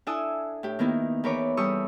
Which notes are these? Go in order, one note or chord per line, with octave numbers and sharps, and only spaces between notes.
D4 E4 A4 G#5 D#6 E6
A2 G4
D#3 A#3 B3 E4
E2 A#4 B4 C#5 D6
E2 G3 A4 C#6 D#6 E6